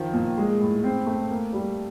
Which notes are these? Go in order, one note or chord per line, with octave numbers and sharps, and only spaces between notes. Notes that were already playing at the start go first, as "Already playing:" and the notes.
Already playing: D#3 F3
A#2
G#3
A2
C4
A3
A#3
G3